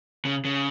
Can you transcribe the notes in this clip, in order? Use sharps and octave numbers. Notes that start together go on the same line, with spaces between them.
C#3
C#3